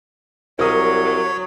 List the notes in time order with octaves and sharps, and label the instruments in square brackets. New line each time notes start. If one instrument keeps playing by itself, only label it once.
[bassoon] C2 [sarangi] F#3 [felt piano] A#4 D#6 [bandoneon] C#5